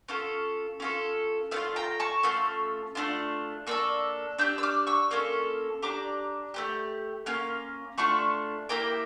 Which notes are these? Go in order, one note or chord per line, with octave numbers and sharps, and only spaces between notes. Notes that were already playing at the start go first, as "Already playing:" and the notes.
C#4 F4 A4
C#4 F4 A4
A3 D4 F4 F5 A5
G5 A#5
A5 C#6
A3 C#4 F4 A4
A3 D4 F4
A#3 D4 A4 C#6 E6
D4 G4 E6 G6
E6
D6 F6
C#6 E6
A#3 C#4 F4 A4
D4 G4 A#5 D6
A3 C#4 G4
A#3 C#4 F4
A3 D4 F4 A5 C#6
A#3 E4 G4 G5 A#5